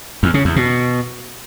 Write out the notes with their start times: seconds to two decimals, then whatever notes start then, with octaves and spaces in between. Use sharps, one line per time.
0.23 E2
0.34 C#3
0.45 E2
0.56 B2